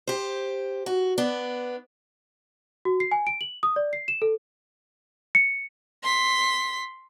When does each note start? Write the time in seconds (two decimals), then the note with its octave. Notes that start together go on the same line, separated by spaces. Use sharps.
0.07 G4 C5
0.86 F#4
1.18 B3 D4
2.85 F#4
3.00 C7
3.11 G#5
3.27 D7
3.41 F#7
3.63 D#6
3.76 D5
3.93 C7
4.08 E7
4.22 A4
5.35 C#7
6.03 C6 B6